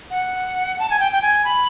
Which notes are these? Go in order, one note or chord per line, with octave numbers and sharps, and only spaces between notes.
F#5
A5
G#5
G5
G5
G#5
B5